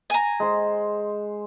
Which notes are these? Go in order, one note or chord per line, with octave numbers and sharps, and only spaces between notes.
G#5 A#5
G#3 C5